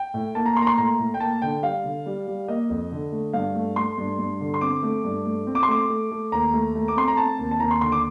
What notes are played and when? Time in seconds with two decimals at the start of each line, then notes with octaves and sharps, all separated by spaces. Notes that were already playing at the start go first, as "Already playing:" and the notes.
Already playing: G5
0.14 A2
0.35 A#3 A5
0.46 A#5
0.57 A#3 C6
0.62 A#5
0.67 C6
0.78 A2 A#5
0.99 A2
1.14 G5
1.20 A#3 A5
1.42 D3 G5
1.63 G3 F5
1.84 D3
2.06 G3
2.27 G3
2.48 A#3 D#5
2.70 F2
2.91 D3
3.12 A3
3.33 G2 F5
3.55 A3
3.76 A3 C6
3.98 G2
4.19 G2
4.40 D3
4.54 C6
4.61 C4 D6
4.83 A3
5.04 G2
5.25 A3
5.47 C4
5.55 D6
5.63 C6
5.68 A3 D6
5.90 A3
6.11 A3
6.32 D#2 A#5
6.53 A3
6.75 A3
6.88 D6
6.96 C4 C6
7.08 A#5
7.17 C4 A5
7.39 D#2
7.51 A5
7.60 D#2 A#5
7.71 C6
7.81 D3 C6
7.92 D6